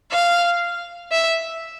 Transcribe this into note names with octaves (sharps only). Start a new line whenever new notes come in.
F5
E5